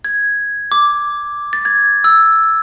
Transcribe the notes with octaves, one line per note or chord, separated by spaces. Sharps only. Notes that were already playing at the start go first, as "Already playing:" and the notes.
G#6
D6
A6
G#6
E6